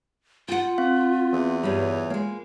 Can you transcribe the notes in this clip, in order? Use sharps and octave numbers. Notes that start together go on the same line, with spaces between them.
F4 F#5 G5
C4 F5
E2
G2 G3 F4 C#5
G#3 A#3